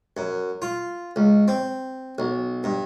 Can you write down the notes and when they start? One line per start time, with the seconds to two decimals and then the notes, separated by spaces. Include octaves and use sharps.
0.17 F#2
0.62 F4
1.16 C#2
1.48 C4
2.18 B1
2.64 G2